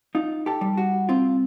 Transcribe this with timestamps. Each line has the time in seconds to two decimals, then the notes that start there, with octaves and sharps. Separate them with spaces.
0.15 D#4 F4
0.46 G4 A4
0.61 G3
0.77 F#4
1.09 C4 F4